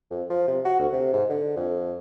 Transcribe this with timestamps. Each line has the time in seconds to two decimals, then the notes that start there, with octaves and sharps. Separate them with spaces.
0.11 F2
0.30 F3
0.48 C3
0.65 F#4
0.80 D2
0.92 C3
1.13 G#2
1.30 D3
1.56 F2